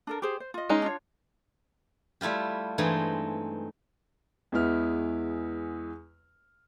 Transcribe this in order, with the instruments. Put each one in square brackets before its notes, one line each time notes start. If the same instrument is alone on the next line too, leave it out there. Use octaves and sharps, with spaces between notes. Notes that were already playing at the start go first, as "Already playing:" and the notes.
[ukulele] D4 A4 A#4
G4 G#4 C5
C5
F4 D#5
[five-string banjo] G#3 C#4 D#4
[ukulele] D4 F4 C#5
[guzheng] G3 A3 E4 F4 G4
G2 E3 G#3 A3 C4 D#4
[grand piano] E2 G#3 B3 E4 F6